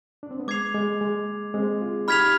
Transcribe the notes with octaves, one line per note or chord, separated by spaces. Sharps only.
D4
C4
B3
G#3 D6 G#6 C7 F7
G#3
G#3
G#3 C4
F4 G#4
D#4 G4 B5 F6 G#6 B6 F7